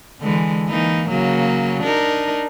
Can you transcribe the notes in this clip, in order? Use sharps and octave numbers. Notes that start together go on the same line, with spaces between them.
D3 E3 G#3
E3 A#3 D#4
C#3 F#3 A#3
D4 D#4 A#4